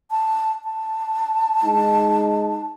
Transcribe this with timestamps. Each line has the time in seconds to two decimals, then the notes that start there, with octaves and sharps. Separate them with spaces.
0.11 A5
0.64 A5
1.64 G#3 D#4